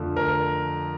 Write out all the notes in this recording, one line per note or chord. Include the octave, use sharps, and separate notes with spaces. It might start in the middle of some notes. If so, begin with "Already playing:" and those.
Already playing: F2 D3 F3 A3
A#4